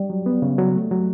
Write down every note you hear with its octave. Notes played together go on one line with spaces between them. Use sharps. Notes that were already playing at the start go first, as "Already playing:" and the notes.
Already playing: G3
F#3
B3
C#3
F#3
A3
F#3